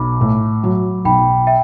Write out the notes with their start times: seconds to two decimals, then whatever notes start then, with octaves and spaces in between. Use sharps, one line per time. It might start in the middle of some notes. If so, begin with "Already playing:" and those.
Already playing: B1 B5 D6
0.21 A2
0.64 F#3
1.05 B1 G5 B5
1.47 E5 G5